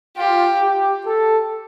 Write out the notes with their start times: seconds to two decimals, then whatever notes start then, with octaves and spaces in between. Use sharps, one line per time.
0.17 F4 G4
0.61 G4
1.06 A4